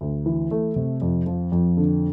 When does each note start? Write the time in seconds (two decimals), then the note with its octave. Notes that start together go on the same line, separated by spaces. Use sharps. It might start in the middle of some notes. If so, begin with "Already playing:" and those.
0.01 D2
0.26 E3
0.51 A3
0.76 C3
1.02 F2
1.26 F3
1.52 F2
1.77 D3